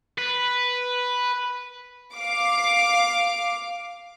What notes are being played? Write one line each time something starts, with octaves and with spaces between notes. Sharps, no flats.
B4
F5 D6